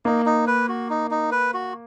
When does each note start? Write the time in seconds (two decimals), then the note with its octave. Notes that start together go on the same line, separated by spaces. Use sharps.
0.05 A#3 D#4
0.26 D#4
0.47 B4
0.68 F#4
0.90 D#4
1.11 D#4
1.32 B4
1.54 F#4